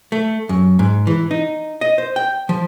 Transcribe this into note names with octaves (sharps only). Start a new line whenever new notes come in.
A3
F#2
G#2
E3
D#4
D#5
C5
G5
F3